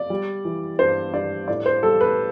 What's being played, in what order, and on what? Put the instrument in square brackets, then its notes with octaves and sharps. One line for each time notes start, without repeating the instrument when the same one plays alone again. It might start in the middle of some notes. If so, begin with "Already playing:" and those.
Already playing: [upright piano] D5
G3
E3
G2 C5
G2 D5
A2 D5
C5
G3 A4
B4